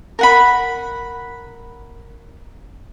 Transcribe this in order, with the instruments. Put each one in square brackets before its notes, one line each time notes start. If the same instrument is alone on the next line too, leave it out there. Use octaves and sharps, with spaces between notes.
[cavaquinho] A#4 F#5 B5